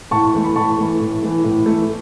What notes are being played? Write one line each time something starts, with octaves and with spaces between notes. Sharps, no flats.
A2 A5 C#6
E3 A3
B5
A2 A5 C#6
E3 A3
A2
E3 A3
A2
E3 A3